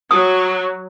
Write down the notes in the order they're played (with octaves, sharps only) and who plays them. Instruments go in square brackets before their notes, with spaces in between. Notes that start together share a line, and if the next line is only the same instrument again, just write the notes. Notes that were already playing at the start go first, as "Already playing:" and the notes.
[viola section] F#3 [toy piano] D#6